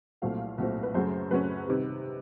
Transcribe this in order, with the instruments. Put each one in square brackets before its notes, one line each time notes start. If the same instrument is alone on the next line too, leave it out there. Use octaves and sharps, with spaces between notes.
[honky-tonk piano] C2 A#2 F#3 A3 C4 F5
C2 A#2 F#3 A3 C4
B4
F#2 C#3 F#3 A3 C#4 C5
F#2 C#3 F#3 A3 C#4 B4
C3 D#3 G3